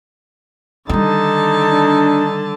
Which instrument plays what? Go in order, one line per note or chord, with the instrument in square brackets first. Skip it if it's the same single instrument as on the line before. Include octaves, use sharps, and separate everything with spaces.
[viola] D3 A5 [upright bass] D#3 G3 [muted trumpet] D#4
[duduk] D4